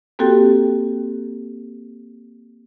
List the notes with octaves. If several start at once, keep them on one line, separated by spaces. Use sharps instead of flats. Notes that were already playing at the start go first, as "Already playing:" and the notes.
A#3 C4 F#4 G4 A4 G5